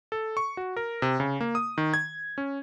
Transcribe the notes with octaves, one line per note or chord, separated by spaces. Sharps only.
A4
C#6
F#4
A#4
C3
C#3
A#3
D#6
D#3
G#6
C#4